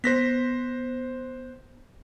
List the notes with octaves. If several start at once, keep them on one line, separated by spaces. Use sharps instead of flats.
B3 C5 A#6 B6